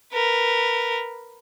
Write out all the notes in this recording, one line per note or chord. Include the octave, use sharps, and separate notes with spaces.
A#4 B4